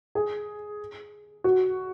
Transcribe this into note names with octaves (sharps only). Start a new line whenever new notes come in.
G#4
F#4